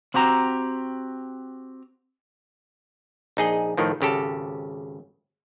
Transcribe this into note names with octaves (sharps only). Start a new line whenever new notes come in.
C4 F#4 G4 A#5
A#1 D#4 G#4 D#5
A2 D#3 F3
G#1 C#3 G4 A4